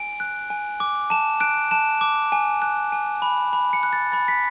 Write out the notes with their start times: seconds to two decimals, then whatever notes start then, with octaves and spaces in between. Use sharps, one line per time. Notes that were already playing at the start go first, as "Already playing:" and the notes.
Already playing: G#5 D7
0.20 F#6
0.50 G#5
0.80 D6
1.10 A5 E7
1.40 F#6 D7
1.71 A5 E7
2.01 D6
2.32 G#5
2.62 F#6
2.92 G#5
3.22 B5
3.53 B5
3.73 C#7
3.83 F#6
3.93 A6
4.12 B5 A6
4.28 B6